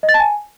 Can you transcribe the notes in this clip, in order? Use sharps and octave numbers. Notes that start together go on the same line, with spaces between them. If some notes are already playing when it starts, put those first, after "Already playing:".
D#5
A6
A5
G#5